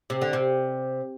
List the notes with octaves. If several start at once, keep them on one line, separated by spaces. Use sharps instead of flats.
C3
D3
C3